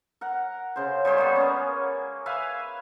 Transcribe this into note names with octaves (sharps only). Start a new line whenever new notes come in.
A#4 F#5
C#3 C5
G3 G#4 C5 C#5
A#3 B3
A#3 C#4
B4 E5 F5 G#5